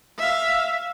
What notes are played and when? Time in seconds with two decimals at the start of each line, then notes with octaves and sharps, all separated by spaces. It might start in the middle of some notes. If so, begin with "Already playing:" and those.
0.18 E5 F5